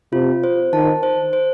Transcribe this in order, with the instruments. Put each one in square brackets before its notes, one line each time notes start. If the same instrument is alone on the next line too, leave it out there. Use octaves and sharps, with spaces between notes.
[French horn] C3 [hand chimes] F4
[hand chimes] C5
[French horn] D#3 [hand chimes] A5
[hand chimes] C5
C5